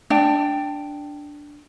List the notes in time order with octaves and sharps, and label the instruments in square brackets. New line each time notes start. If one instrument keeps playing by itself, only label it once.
[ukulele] D4 G5